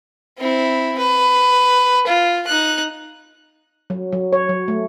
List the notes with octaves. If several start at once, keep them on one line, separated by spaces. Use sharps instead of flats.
C4 E4
B4
F4
D#4 F#6
F#3
F#3
C#5
F#3
A3